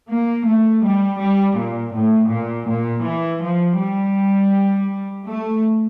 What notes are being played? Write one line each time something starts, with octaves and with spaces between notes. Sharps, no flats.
A#3
A3
G3
G3
A#2
A2
A#2
A#2
E3
F3
G3
A3